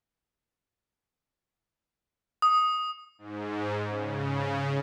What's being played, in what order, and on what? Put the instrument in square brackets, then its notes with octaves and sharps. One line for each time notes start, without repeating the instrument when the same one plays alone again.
[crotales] D#6
[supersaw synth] G#2
C#3